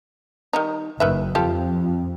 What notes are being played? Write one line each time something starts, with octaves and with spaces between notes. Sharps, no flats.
D#3 G3 D#4
F#1 D#3 B4 E5
F2 F4 G4 A4